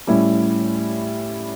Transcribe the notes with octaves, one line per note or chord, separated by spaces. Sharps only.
A2 G3 C#4 E4